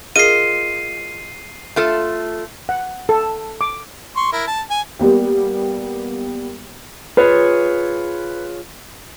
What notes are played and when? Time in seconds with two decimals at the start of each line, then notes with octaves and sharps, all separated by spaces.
0.16 F4 G#4 A#4 D#5 C7 D#7
1.76 A3 F4 A4
2.69 F#5
3.09 A4
3.61 D6
4.16 C6 C#6
4.32 E4 A#4
4.48 A5
4.70 G#5
4.99 G3 A#3 B3 G4
7.17 F4 G#4 B4 C#5